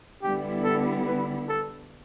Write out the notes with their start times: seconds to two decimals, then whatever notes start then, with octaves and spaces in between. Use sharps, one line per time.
0.22 D3 G3 B3 E4 G4
0.64 A4
1.06 B4
1.48 A4